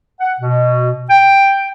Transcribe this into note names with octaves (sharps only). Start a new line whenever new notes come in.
F#5
B2
G5